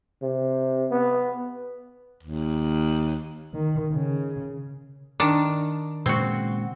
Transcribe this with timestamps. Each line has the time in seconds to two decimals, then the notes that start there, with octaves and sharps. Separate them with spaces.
0.22 C3
0.91 B3
2.23 D#2
3.54 D#3
3.92 C#3
5.20 D#3 D4
6.06 A#2 C#3 G#3 C4 F#4